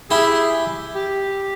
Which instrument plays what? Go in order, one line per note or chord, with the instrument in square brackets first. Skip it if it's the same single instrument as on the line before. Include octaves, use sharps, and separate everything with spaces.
[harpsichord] E4 G4 [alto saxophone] G#4
[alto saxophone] G4